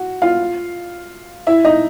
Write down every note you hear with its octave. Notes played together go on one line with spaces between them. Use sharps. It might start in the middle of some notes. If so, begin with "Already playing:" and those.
Already playing: F#4
F4 F5
E4 E5
D#4 D#5